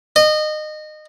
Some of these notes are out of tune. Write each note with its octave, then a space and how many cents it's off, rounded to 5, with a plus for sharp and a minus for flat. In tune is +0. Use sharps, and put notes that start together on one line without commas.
D#5 -25